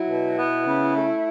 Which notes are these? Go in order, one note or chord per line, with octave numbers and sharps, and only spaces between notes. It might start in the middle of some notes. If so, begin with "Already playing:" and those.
Already playing: F#3 E4
B2
B3
C#3
A3